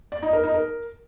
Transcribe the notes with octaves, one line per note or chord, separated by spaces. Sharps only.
D5
D#4
A#4
D#4
A#4